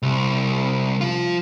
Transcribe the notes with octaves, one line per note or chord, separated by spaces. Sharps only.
C2
F3 F4